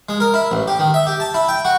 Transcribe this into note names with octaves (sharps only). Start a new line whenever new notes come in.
G#3
A#4
E4
A1
G4
D#3
E5
G4
A5
E4
G5
F#4